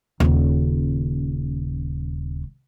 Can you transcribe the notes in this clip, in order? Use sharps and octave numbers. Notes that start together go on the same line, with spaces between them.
D#1 C#3